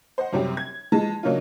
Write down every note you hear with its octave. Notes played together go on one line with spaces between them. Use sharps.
C5 D#5 F#5
F#2 C3 F#3 G3 C4
G#6
E3 F3 G#3 A5
C#3 F#3 A#3 D4 D#4 F4